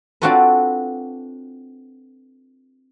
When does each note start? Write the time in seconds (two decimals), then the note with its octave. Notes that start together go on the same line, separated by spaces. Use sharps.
0.22 C4 D4 F4 F#4 A4 B4